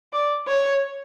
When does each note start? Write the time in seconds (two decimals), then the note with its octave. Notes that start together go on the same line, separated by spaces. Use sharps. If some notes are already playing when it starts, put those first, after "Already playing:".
0.13 D5
0.48 C#5